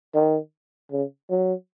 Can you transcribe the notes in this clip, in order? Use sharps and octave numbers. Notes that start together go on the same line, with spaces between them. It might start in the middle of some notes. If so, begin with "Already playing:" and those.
D#3
C#3
F#3